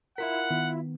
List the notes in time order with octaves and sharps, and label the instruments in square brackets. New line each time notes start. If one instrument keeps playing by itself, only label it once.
[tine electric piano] E4 F4 B6 [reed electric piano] A#4 [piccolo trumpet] F#5
[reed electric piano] D#3 B3